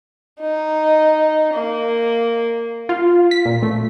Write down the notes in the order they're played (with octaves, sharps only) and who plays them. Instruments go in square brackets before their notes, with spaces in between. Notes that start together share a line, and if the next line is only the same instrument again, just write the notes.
[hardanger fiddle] D#4
A#3
[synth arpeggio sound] F4
B6
A#2
A3